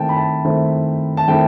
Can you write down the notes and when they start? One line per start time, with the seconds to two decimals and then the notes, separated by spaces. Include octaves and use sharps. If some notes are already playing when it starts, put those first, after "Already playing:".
Already playing: D#3 A3 C4 E4 G5 A5
0.09 B5
0.16 A5
0.45 D#3 A3 C4 E4
1.17 A5
1.28 D#3 A3 C4 E4 G5